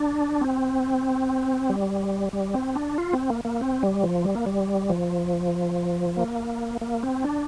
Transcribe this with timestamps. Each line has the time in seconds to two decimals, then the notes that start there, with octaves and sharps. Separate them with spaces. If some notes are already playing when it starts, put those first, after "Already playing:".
Already playing: D4
0.41 C4
1.70 G3
2.33 G3
2.54 C4
2.75 D4
2.98 F4
3.13 C4
3.30 A#3
3.45 A#3
3.61 C4
3.83 G3
4.04 F3
4.25 G3
4.35 A#3
4.46 G3
4.90 F3
6.17 A#3
6.81 A#3
7.03 C4
7.24 D4